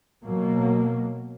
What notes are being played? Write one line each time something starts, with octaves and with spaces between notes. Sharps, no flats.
B2 F#3 A#3